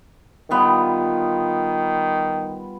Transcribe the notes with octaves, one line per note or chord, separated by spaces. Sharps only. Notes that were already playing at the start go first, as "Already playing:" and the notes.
D#3 G3 B3 F4